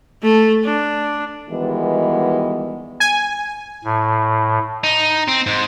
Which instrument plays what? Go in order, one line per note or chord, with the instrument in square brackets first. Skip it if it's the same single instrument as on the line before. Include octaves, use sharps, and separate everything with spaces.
[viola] A3
D4
[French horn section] B2 D#3 E3 G3 G#3 B3
[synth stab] G#5
[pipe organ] A2
[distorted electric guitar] D#4
C4
G#2